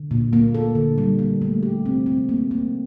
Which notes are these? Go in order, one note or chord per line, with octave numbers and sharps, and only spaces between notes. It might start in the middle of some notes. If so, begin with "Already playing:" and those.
Already playing: D3
A#2
A#3
A4
D3
G3
A#3
A3
G4
C4
C4
A#3
A#3